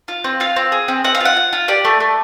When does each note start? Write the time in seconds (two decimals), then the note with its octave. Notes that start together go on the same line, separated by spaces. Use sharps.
0.08 F4
0.24 C4
0.40 F4 F5
0.56 C4
0.72 G#4
0.88 C4
1.04 C4 F#5
1.15 F5
1.20 F4 F#5
1.37 F4
1.53 F4
1.68 G4 D5
1.85 A3
2.00 A3